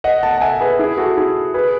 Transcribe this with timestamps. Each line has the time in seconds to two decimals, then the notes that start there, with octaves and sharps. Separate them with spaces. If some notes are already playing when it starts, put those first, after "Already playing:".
0.04 D#5 F#5
0.23 F#5 A5
0.38 A5
0.41 E5 G#5
0.61 G#4 B4
0.79 E4 G#4
0.98 F#4 A4
1.17 E4 G#4
1.54 G#4 B4